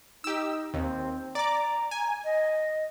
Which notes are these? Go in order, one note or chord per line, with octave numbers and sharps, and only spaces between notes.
D#4 G4 E6
D#2 C4
D5 A#5 D6
G#5
D#5